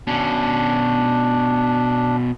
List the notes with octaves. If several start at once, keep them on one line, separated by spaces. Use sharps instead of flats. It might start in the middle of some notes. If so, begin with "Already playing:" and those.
B2 C#4 D4